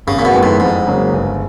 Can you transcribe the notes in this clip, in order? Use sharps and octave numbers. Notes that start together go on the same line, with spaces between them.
G#1 C#3
A#2
B2
F#2 D#3 G#3 B3
A2
F2 G#2
C#3 F#3 A#3
G1